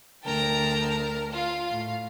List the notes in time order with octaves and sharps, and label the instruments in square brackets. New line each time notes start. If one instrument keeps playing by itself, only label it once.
[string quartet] D2 A#4 A5 [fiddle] G5 A#5
[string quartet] F4 [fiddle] F5
[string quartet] A2